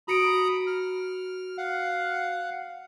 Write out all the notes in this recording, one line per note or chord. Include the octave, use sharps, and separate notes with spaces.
F#4 A#5 B5 D#6 C#7 D7
F6
F5 F#5